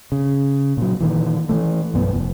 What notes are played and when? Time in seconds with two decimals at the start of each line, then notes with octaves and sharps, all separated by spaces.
0.12 C#3
0.77 A#2 F#3
1.01 A#2 D#3 E3
1.49 E3 F3 A3
1.94 B1 G2 B3
2.14 F1